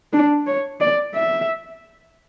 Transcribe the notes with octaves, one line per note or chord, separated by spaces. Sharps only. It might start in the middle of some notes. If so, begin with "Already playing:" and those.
D4
C#5
D5
E5